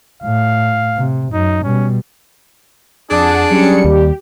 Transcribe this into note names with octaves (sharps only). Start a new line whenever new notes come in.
A2 F5
C3
F#2 D#4
B2 G3 C#4
F2 D4 G#4 F#5 A5
F#3 G3 C#4 C#7
D#2 G4